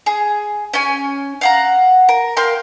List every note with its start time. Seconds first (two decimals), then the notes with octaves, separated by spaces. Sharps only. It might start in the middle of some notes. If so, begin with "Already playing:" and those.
0.06 G#4
0.73 C#4 G#5
1.41 F5 F#5 A#5
2.09 A#4
2.37 A#4 F5 G5 C6